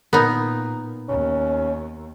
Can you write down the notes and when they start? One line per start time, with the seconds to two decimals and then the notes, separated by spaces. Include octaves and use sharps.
0.13 A#2 B3 D#4 A#4
1.09 D#2 C#4